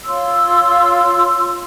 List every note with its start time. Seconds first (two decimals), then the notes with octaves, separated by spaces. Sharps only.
0.05 F4 C#5 C6 E6